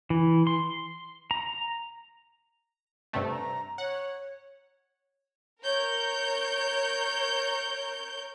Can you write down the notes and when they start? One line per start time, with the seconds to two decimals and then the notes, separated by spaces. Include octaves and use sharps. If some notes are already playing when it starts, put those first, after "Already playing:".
0.10 E3
0.47 C6
1.31 A#5
3.13 G2 C3 A3
3.28 A#5
3.78 C#5 F#5
5.61 A#4 C#5 G6